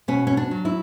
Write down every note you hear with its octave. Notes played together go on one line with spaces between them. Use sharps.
B2 C#4
C#4
D4
F#3
E4